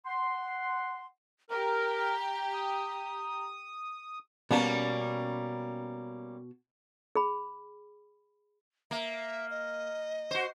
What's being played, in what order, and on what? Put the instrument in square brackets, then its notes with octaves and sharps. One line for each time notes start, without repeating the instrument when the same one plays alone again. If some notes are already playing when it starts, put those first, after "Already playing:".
[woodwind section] F#5 C6
[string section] G4 [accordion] A#4 [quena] A#5
[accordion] D#6
[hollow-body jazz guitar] B2 A5 [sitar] G3 A#3 C#4
[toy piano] G#4 B5
[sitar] A#3 [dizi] E5
[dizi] D#5
[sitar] F#4 C5